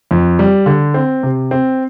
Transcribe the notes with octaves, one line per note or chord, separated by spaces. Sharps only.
F2
G3
D3
C4
C3
C4